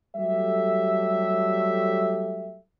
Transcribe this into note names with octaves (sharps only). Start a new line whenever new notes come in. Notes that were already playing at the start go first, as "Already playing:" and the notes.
F#3 G3 A3 G4 A4 E5